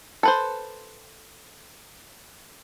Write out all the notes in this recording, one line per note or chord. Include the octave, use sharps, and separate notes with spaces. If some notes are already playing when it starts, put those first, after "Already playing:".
A4 B4 C5